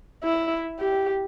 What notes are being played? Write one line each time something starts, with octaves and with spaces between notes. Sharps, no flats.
E4
G4